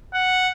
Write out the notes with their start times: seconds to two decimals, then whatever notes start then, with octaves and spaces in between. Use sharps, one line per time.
0.14 F#5